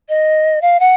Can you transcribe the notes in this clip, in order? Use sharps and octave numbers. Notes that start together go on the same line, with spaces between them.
D#5
F5
F#5